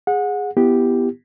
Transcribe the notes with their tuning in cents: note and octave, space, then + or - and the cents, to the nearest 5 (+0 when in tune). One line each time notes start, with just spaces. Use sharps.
G#4 -10 F#5 -25
B3 +0 E4 +15 G4 +0